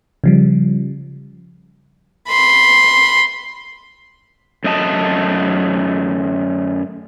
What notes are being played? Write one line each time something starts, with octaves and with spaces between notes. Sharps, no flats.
C#3 F3 G3
B5 C6
F#2 A3 D#5 A5